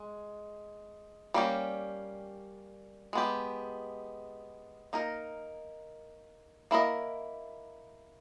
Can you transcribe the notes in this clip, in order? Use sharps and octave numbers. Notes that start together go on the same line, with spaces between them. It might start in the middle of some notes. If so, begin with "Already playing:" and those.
Already playing: G#3
G3 A#3 C#4 G4
G#3 B3 G4
A#3 D#4 A#4
A#3 E4 A#4 D#5